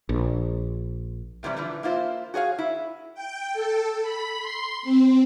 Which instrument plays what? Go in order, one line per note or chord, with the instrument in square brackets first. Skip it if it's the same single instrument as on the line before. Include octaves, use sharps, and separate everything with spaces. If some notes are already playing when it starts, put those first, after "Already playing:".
[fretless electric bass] A#1
[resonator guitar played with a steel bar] A2 C3 E3 G3
D3 E3 F3
A#3 E4 F4 C5
F#4 G#4 C#5 F5
E4
[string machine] G5
A4
B5
C6
C4